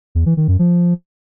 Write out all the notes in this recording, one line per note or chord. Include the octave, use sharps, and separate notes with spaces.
E2
E3
D#3
F#2
F3